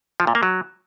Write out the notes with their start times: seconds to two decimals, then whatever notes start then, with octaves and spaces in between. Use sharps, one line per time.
0.20 F3
0.27 A#2
0.35 A#3
0.43 F#3